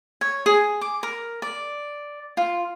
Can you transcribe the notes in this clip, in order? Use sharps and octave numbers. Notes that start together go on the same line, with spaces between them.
C#5
G#4
D6
A#4
D5
F4